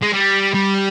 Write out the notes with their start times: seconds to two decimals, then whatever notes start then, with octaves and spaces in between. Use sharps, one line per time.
0.03 G#3
0.13 G3
0.54 G3